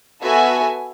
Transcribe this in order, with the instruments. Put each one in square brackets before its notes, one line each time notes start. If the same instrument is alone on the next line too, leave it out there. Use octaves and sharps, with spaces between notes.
[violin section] B3 F#4 A4 E5 G#5